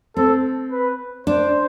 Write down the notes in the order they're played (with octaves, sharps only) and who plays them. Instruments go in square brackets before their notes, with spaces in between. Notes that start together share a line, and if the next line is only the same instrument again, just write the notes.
[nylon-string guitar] C4 [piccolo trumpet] A4
[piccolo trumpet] B4
[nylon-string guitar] D4 [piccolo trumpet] C5